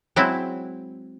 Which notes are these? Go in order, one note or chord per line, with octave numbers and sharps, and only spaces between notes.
F#3 G#3 C4 E4